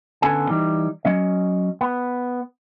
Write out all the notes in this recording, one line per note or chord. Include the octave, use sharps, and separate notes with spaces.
D3 B3 C#4 A4 G#5
E3 G3 D#4
F#3 C#4 D#5
B3